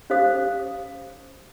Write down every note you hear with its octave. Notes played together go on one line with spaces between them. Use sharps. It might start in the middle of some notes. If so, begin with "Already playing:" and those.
C#4 G4 C5 F5 D#6